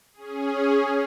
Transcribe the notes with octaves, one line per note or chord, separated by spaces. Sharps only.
C#4 G#4